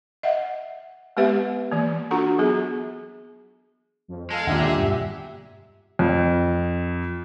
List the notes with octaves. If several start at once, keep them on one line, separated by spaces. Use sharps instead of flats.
D#5 E5 F#5
G#3 B3 C4 G4 B4 E5
E3 A#3
D4 F4 F#4 A4 F#5 A#5
F#3 B3 G#4
F2
G#3 A4 F5
D#2 A#2 D3 D4 G4 E5 F#5
G2 B2 D3
F2